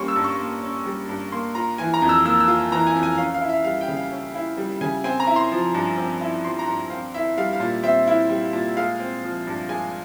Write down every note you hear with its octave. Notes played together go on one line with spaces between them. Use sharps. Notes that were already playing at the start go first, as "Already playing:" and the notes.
Already playing: G3 A#3 C#4 C6 C#6
E6
G2
C#6
A#3
C#4
G3
G2
A#3 C6
F4 A#5
E3 G#5
A#5
F2
E6
A#3 E6
E6
F4
E3 A#5
G#5
F2
G#5
C#4 F5
F5
E4
E5
G3 F5
G5
C#3
F5
C#4
E4
G3
C#3 G#5
C4 G#5
A#5
E4
C6
F3
G2
C4
E4
F3 C6
A#5
G2
C4 F5
E4 E5
G3 F5
F5
A#2
C4 E5
E4
G3
A#2
G#3 F5
C4
F3
G2
G#3 G#5